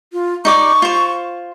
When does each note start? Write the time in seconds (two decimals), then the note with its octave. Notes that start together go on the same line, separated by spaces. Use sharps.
0.13 F4
0.45 D#4 D5 C#6 D6
0.82 F4 C5